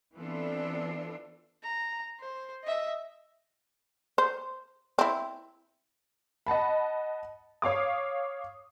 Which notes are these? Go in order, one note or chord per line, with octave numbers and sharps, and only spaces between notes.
E3 B3 C4 D4 F4 A4
A#5
C5
D#5 E5
C5
C4 E4
D#5 F#5 A5 B5
C#5 F5 D6 D#6